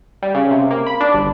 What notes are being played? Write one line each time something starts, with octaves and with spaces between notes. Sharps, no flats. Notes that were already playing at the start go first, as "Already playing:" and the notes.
G3
C#3
C3
A#3
B5
D4
G1